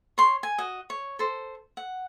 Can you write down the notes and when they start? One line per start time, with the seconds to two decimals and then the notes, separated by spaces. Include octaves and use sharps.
0.18 C#5 C6
0.43 G#5
0.58 F#4 D#5
0.90 C#5
1.19 A4 C5
1.77 F#5